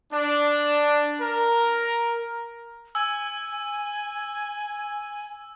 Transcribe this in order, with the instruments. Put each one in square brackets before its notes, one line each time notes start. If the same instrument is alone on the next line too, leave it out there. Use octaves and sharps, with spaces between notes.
[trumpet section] D4
A#4
[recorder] G#5 [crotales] E6